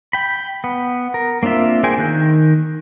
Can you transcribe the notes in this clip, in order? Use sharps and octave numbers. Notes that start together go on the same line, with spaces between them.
G5 B5
B3
A#4
A#3 C4 D4 F4 E5
A#3 G#4 C5 G5 G#5
D#3 F#6 G6